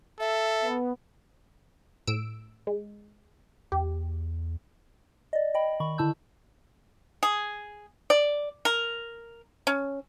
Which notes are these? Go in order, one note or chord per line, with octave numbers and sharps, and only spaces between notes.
A4 E5
B3
A2 E6 D7
G#3
E2 G4
D5 D#5
D#5 G5 B5
D#3 B5 C#6
D3 E4 A5 E6 G6
G#4
D5
A#4
C#4